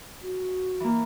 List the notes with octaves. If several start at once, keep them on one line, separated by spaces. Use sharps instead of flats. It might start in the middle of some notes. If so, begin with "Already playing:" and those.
F#4
E3 A#3